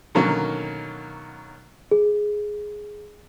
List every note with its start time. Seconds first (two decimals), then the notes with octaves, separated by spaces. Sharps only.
0.15 B2 D3 D#3 F#3 A#3 C#4
1.91 G#4